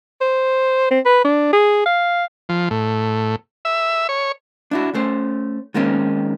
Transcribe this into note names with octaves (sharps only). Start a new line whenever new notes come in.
C5
C4
B4
D4
G#4
F5
F3
A2
E5
C#5
D4 E4 F#4
A3 C#4 C5
D#3 G#3 A#3 C4 C#4 D#4